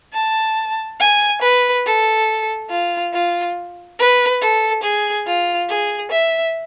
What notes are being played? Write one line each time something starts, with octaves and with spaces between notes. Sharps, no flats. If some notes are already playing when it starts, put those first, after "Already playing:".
A5
G#5
B4
A4
F4
F4
B4
A4
G#4
F4
G#4
E5